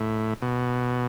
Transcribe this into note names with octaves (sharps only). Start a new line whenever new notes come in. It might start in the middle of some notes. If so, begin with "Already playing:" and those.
Already playing: A2
B2